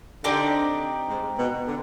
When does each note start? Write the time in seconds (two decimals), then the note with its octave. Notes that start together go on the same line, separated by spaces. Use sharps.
0.24 D3 C4 D#4 G4 D5
1.09 G#2
1.39 B2
1.67 D3